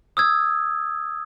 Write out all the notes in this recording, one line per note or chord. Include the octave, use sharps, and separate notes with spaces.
D#6 E6 G#6